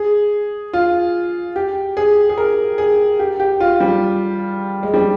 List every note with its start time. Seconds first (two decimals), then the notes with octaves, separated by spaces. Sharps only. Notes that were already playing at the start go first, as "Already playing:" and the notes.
Already playing: G#4
0.73 F4
1.56 G4
1.97 G#4
2.29 G#4
2.38 A#4
2.78 G#4
3.19 G4
3.40 G4
3.60 F4
3.80 G3
4.83 G#3
4.94 G3